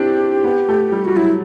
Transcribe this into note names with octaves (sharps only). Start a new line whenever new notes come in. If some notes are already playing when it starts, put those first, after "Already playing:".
Already playing: C4 D4 E4 G4
B3
A3
G3
G3 F#4
F#3 E4